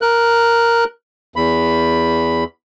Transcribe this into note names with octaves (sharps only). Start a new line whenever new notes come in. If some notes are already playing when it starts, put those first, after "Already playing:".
A#4 F#6
E2 B5